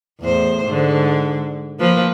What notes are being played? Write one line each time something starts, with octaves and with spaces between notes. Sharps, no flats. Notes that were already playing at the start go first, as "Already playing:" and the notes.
E2 A2 C5
G#2 D3
F3 A#3 B4